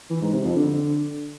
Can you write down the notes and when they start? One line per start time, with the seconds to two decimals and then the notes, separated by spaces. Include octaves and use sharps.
0.10 E3
0.21 G#2
0.33 C3
0.44 F2
0.56 D3